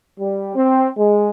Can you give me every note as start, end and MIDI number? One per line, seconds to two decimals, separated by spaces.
0.19 0.54 55
0.56 0.88 60
0.97 1.30 56